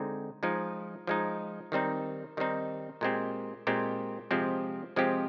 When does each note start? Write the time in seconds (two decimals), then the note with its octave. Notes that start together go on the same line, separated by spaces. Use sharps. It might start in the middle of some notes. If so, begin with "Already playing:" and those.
Already playing: D3 G#3 C4 D#4
0.43 F3 G#3 D#4
1.07 F3 G#3 D#4
1.72 D#3 G3 C4 D#4
2.37 D#3 G3 C4 D#4
3.01 A#2 G#3 C4 G4
3.67 A#2 G#3 C4 G4
4.31 C3 F3 G#3 C4 G4
4.96 C3 F3 G#3 C4 G4